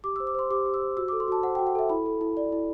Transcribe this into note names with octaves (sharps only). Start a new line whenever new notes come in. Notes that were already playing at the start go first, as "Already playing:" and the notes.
G4 D6
E6
C5
D6
C5 C6
G4 D6
G4
E6
C5
F#4 E6
D6
A4
C6
F#4 A5
C5 F#5
G5
F#4
F#5
A4 E5
E4 B5
A4
E4
D5
E4